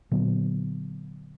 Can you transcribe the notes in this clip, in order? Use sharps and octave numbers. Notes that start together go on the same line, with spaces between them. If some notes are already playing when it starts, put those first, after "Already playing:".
A#2 D3 F#3 B3